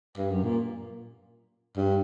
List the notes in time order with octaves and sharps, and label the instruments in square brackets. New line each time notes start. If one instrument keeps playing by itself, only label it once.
[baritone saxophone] G2
F#2
A#2
G2